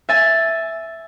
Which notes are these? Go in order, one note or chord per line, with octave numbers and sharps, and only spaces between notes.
E5 G#5 A6